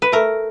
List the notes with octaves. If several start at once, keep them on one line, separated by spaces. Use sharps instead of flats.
B4
A3 A#4